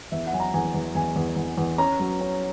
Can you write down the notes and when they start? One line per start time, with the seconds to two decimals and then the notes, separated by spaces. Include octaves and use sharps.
0.12 E2 E5
0.26 F#5
0.33 F#3 G#5
0.40 A#5
0.54 E2 G#5
0.74 E2
0.95 E2 G#5
1.16 E2
1.36 E2
1.57 E2
1.78 C#4 A#5
1.99 F#3
2.21 C#4